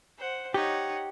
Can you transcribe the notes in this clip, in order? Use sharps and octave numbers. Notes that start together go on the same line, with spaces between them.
C5 F#5
D#4 G4 C#5 F#5